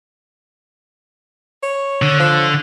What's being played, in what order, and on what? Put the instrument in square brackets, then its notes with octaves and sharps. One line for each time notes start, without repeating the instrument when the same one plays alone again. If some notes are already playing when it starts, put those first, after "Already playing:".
[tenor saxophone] C#5
[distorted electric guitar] D3
[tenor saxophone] F3